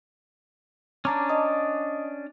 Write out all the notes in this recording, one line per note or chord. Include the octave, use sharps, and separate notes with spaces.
C#4 D4 A5 A#5 D6
D#5 D#6